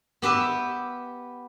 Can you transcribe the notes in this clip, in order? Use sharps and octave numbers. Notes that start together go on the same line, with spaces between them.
B3 G4 B4 E5